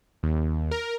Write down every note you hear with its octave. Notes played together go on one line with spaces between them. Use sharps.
D#2
A#4